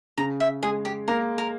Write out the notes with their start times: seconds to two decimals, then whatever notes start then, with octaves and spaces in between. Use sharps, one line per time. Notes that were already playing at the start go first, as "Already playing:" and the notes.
0.17 C#3 A#5
0.40 E5
0.63 G#3 G#4
0.85 G4
1.08 A#3 A#4
1.38 A#4